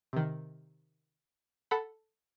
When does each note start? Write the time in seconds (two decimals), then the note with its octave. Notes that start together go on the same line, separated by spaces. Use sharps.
0.13 C3 D#3
1.71 A4 F#5 B5